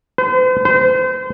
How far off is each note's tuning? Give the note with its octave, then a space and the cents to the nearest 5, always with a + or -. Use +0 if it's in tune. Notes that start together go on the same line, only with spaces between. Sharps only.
C5 -45
C5 -35